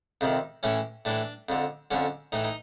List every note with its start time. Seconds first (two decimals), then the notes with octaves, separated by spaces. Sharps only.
0.21 F2 C3 D#3
0.63 A2 E3 C#4
1.05 A2 E3 D4
1.49 F2 D3
1.91 F2 D3 C#4
2.32 A2 E3 D#4
2.44 D#4